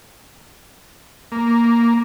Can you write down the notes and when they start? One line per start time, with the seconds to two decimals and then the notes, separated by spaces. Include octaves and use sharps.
1.32 A#3